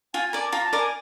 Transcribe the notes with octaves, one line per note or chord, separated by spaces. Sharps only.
F4 G#5
G#5
A#4 D5
A5
F4 A#5
A5
A#4 D5
G#5